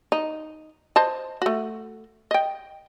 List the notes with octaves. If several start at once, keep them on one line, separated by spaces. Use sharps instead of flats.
D#4
C5 D#5 A5
A3 F#4
D#5 G5